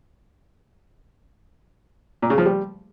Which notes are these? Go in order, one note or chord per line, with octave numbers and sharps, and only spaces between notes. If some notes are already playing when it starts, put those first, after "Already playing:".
A#2
C#3
F3
G3